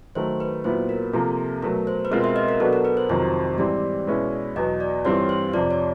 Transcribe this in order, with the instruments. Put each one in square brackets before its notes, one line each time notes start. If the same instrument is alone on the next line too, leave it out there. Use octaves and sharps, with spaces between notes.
[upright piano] D#3 F#3 A3 [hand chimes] C5
[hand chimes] B4
[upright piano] A#2 F#3 B3 E4 [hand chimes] C5
[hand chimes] A#4
[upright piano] C3 F3 A#3 [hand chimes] A4
[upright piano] B2 F#3 A3 [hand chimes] A#4
[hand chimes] C5
B4
[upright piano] B2 G#3 C4 F4 [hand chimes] A#4
[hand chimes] E5
D#5
A#4
[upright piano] B2 F#3 B3 D4 F#4 [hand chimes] A4
[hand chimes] A#4
B4
C5
[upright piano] F2 C3 D#3 F#3 [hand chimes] C5
[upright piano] G#2 E3 G3 C4 [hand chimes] D5
[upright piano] B2 G#3 C#4 E4
[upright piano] E2 B2 F#3 [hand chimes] D#5
[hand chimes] D5
[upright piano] G2 E3 G3 C4 F4 [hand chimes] C#5
[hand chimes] C5
[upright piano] F2 C3 F3 [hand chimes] D5
[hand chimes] C#5